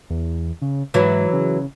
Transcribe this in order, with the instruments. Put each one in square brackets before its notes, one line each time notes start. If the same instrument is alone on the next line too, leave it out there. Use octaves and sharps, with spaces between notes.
[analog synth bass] E2
C#3
[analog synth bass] G#2 [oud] E3 F#3 E4
[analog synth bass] C#3